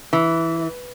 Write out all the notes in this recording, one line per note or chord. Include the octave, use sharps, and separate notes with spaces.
E3